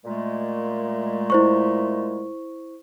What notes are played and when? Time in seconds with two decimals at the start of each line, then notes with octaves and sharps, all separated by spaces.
0.05 A#2 G#3 A3
1.30 E4 C5 C#6